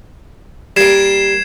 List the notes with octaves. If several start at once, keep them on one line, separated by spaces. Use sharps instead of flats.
G3 A#3 G#6 C7 E7